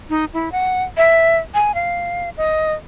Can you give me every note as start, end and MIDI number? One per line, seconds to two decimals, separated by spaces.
0.10 0.25 63
0.34 0.51 64
0.52 0.83 78
0.97 1.37 76
1.54 1.74 80
1.75 2.30 77
2.37 2.73 75